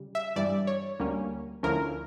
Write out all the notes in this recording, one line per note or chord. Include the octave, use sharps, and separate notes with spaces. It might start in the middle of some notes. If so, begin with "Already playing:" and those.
Already playing: C#3 G3
E5
G2 E3 G3 D5
C#5
D2 D3 G3 A#3 C#4
D2 D3 F3 C#4 E4 A#4